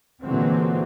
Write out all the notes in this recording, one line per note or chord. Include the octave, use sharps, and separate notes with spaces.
A#2 D3 E3 F#3 G#3 C4